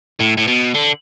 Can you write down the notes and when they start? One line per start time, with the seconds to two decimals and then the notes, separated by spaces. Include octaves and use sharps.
0.20 A2
0.37 A2
0.47 B2
0.74 D3